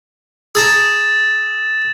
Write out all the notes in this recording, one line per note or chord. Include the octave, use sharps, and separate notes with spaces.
G#4 A5 A#5 E6 A6 E7